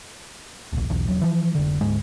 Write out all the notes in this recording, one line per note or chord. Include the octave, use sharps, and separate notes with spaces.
D1 A#1
B1 E2
E1 F#3
E3 F3
F1 D3
D2 G#2 G#3